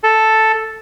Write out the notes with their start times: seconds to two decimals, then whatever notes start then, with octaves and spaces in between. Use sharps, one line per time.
0.04 A4